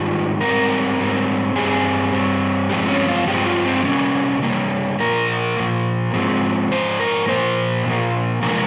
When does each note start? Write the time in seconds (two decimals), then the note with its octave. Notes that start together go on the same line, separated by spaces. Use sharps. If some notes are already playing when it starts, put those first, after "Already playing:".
Already playing: G#2 D#3 G3 F4
0.41 G#2 G3 C4 A#4
0.98 G#2 G3 C4
1.56 G2 G3 C4 G#4
2.12 G2 G3 C4
2.69 G2 F3 G#3 C4 G4
2.89 C#4
3.08 F4
3.27 G2 F3 G#3 C4 G4
3.46 F4
3.65 C4
3.85 C3 G3 A#3 C#4
4.42 C3 G3 A#3
5.00 A#2 F3 A#3 A#4
5.57 A#2 F3 A#3
6.13 G#2 F3 G#3 C4
6.71 G#2 F3 C5
7.00 A#4
7.28 A#2 F3 A#3 C5
7.86 A#2 F3 A#3
8.42 C3 F3 G#3 A#4